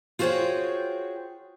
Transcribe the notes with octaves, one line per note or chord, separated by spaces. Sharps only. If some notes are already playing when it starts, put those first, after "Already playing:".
F4 F#4 G#4 C5 C#5 G5